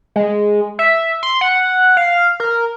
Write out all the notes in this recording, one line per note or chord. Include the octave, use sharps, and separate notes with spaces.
G#3
E5
C6
F#5
F5
A#4